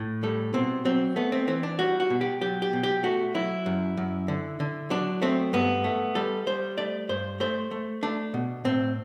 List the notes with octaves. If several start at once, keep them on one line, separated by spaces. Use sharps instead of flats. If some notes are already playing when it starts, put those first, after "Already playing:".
Already playing: A2
G3 A4
B2 C4
F#3 C4
A3 B3
C4
E3 C4
D4
G3 F#4
F#4
B2
G4
F#3 G4
G4
B2
G4
A3 F#4
F#3 E4
F#2
F#2
D3
D3
F#3 D4
A3 C4
G2 B3
A3
G3 A4
G3 C5
A3 D5
G2 C5
A3 C5
A3
A3 D4
B2
A2 C4